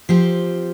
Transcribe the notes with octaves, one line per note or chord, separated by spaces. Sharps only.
F3 C4 G4